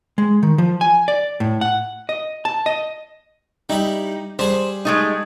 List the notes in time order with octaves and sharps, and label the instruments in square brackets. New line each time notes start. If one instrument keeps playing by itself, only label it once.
[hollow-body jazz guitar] G#3
D#3
F3
G#5
D5
A2
F#5
D#5
A5
D#5
[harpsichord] G3 E4 G4 [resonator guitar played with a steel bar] D#4
[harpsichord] G3 D4 G#4 [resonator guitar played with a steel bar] C5
[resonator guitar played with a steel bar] G#3 A3 D#4